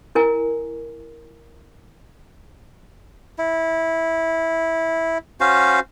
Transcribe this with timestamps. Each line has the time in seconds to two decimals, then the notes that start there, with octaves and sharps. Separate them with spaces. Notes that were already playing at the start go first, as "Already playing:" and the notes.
0.15 E4 A#4 G#5
3.38 E4
5.40 C#4 F#4 C5 F5